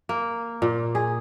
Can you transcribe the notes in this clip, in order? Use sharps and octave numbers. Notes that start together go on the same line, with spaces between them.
A#3
A#2
G#4